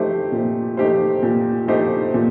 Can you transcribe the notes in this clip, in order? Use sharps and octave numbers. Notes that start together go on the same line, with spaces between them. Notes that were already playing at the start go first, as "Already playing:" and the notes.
Already playing: A3 D#4 G4 C5
A#2
A3 D#4 G4 C5
A#2
A3 D#4 G4 C5
A#2